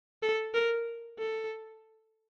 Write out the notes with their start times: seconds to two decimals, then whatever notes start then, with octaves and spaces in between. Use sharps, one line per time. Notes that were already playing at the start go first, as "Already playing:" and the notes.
0.23 A4
0.54 A#4
1.19 A4